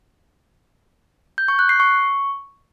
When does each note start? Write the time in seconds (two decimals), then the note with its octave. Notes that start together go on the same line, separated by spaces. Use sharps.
1.38 G6
1.48 C#6
1.59 F#6
1.69 C7
1.80 C#6